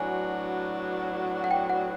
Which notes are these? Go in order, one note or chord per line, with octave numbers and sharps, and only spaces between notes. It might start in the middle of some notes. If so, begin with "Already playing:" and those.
Already playing: A2 F#3 B3 D4 F#4 G#5
F#5
G5
F#5